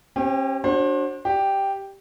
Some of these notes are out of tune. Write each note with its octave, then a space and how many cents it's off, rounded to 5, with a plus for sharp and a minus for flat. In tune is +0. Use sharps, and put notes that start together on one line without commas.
C#4 -40 G4 +0 C5 +0
D4 -10 F#4 +10 C5 +35
G4 +0 D5 +20